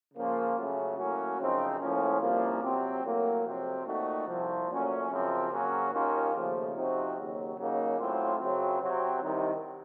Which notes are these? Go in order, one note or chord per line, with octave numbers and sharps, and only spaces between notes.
C#3 F3 A#3 C#4 F4
C#3 F#3 A3 C#4
A2 F#3 A#3 C#4 F#4
F#2 C#3 F3 C4 D#4
A2 F3 A#3 C#4
C2 A#2 F3 A#3
C3 F#3 C4
A2 F#3 A#3
F2 C3 F#3 C4
A#2 A3 C4 D#4 F#4
C2 C3 F3
A#2 F#3 A3 C#4
F#2 C#3 F3 C4
C#3 F#3 A#3 C#4 F#4
D#2 D#3 A#3 C#4 F4
D#2 C#3 F3 A3
C3 F3 C4 D#4 F#4
D#2 C#3 F#3
C#3 F#3 A#3 D#4
A2 F#3 C4 F4
F#2 C#3 F#3 C4
C3 F#3 C4
C2 C3 D#3